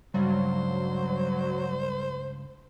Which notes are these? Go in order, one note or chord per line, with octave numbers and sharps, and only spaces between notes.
C#2 G2 F#3 G3 C5